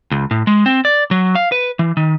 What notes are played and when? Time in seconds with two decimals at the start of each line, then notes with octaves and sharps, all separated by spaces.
0.11 C#2
0.31 A2
0.47 G#3
0.66 C4
0.85 D5
1.11 F#3
1.35 F5
1.52 B4
1.79 E3
1.97 D#3